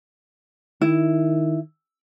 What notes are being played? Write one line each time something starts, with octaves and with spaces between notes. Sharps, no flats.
D#3 E4